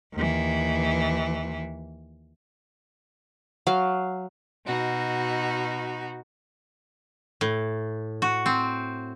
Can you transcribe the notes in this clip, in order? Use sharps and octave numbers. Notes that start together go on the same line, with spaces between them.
D#2 E3
F#3 F5
B2 D#4 F#4
A2
F#4
C4